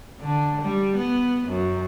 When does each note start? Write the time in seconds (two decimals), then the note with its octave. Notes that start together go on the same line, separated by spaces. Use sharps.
0.20 D3
0.61 G3
0.96 B3
1.48 F#2